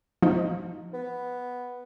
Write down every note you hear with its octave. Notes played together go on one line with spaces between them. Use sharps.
F3 D#4
B3